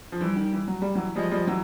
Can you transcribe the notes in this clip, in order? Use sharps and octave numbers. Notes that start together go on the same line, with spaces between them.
F3
E3 G3
D#3
E3
F#3
G3
E3 F#3
F3 G3 G#3
F3 G3
E3 F#3